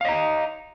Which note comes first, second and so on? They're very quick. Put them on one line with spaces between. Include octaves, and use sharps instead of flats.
F5 D#5 A#5